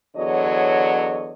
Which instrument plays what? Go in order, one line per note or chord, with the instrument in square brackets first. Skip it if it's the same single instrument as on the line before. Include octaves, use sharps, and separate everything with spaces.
[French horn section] E2 D3 F#3 C#5 D#5